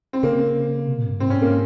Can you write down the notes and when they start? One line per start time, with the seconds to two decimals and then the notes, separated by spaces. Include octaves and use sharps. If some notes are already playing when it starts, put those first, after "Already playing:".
0.13 C4
0.23 C#3 A#3
0.87 C3
0.99 A#2
1.05 G#2
1.09 G2
1.20 G#2 C4
1.30 C#4
1.42 A#3